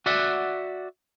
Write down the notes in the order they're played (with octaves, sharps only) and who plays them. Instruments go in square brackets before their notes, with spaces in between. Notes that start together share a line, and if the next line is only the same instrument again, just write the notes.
[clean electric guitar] F#4 D5 E5 F#5